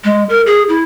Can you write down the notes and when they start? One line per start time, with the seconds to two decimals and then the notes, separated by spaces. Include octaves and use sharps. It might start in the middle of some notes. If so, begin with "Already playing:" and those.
0.04 G#3
0.29 A#4
0.47 G#4
0.69 E4